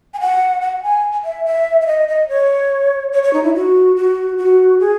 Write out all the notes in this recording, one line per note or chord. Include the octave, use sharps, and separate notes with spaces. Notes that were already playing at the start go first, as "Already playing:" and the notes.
G#5
F#5
F#5
G#5
E5
E5
E5
D#5
D#5
C#5
C#5
C#5
D#4
E4
F#4
F#4
F#4
G#4